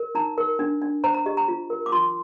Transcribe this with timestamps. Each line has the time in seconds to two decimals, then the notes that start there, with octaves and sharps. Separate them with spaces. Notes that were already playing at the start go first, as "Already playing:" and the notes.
Already playing: A#4
0.15 D#4 A#5
0.38 A#4
0.59 D4
0.82 D4
1.04 C5 A#5
1.14 A#5
1.26 G4 D#5
1.37 A#5
1.48 F4
1.70 A#4
1.86 D6
1.92 F4 C6